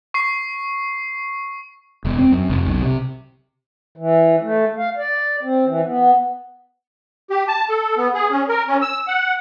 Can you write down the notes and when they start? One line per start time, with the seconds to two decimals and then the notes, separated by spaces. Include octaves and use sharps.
0.14 C#6 C7
2.05 E1
2.19 C4
2.32 F#2
2.50 F1
2.67 B1
2.82 C3
3.97 E3
4.42 A3
4.78 F5
4.97 D5
5.43 C4
5.66 E3
5.86 B3
7.30 G4
7.48 A5
7.69 A4
7.97 B3
8.14 G#4
8.31 C#4
8.49 A#4
8.68 C#4
8.82 E6
9.07 F#5